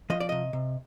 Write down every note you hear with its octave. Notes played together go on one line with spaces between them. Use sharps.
F3 D#5
D5
C3 D#5
C3